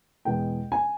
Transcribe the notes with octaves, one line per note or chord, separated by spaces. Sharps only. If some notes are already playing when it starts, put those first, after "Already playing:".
E2 B2 G#3 B3 G5
G#5